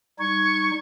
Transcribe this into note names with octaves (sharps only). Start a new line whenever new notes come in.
G3 D#4 C#6 G#6